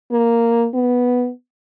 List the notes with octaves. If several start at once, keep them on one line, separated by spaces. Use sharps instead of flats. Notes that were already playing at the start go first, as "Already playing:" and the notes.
A#3
B3